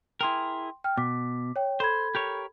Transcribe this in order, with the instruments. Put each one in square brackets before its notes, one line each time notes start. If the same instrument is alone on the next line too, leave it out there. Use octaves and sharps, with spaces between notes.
[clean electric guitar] E4 G#4 A#4 [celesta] G5 C6
[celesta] G5 F6
[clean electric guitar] B2 [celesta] D6 B6
[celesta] C#5 G5
[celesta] A4 B5 G#6 [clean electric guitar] C5
[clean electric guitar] G4 A#4 C#5